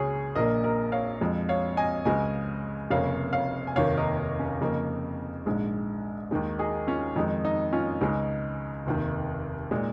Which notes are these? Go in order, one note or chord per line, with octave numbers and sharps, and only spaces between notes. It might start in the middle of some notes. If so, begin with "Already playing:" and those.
Already playing: C#2 C#3 G#4 C#5
A#1 A#2 A#3 A#4 D#5
A#4 D#5
C#5 F5
F2 F3 G#3
C#5 F5
D#5 G#5
C#2 C#3 G#3 D#5 G#5
F1 F2 C#3 A#3 C#5 F5
C#5 F5
G#5
F1 D#2 D#3 A#3 C#5 F5
A#4 D#5
D#4
C#4
F2 C#3 A#3 D#4
A#1 G#2 G#3
D#2 D#3 G#3
D#4 G#4
C#4 F4
F2 D#3 G#3 D#4
D#4
C#4 F4
C#2 C#3 G#3 D#4
F1 D#2 D#3
A#2 G#3 D#4